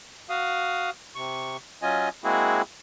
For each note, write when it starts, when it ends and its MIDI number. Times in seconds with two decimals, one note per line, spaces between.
0.29 0.90 66
0.29 0.90 77
0.29 0.90 87
1.15 1.57 48
1.15 1.57 85
1.82 2.09 54
1.82 2.09 61
1.82 2.09 65
1.82 2.09 75
1.82 2.09 80
2.24 2.62 56
2.24 2.62 58
2.24 2.62 60
2.24 2.62 64
2.24 2.62 66
2.24 2.62 68